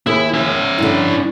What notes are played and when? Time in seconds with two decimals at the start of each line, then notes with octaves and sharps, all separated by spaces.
0.07 D#2 E4 G#4
0.34 C#4 E5
0.78 G2 D3 E4